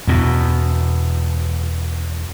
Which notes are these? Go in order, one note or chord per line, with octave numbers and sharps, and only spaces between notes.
E2 B2